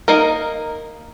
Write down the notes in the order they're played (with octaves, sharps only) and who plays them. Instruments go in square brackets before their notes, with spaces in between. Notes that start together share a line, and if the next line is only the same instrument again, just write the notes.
[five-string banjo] A#3 D#4 A#4